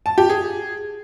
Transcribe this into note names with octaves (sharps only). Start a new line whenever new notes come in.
A5
G4
G#4